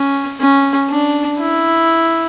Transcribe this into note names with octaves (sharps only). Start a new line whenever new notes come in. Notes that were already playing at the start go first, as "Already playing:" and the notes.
Already playing: C#4
C#4
D4
E4